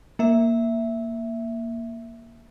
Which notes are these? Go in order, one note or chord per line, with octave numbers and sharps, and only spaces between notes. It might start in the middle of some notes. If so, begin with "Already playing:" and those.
A#3 E5